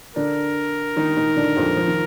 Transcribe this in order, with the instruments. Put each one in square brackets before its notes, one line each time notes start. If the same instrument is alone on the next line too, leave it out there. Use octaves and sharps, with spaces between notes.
[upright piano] D3 D4 [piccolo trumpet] A#4
[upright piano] D#3 D#4
D#3 D#4
D3 D4
F2 F3
F3
D#3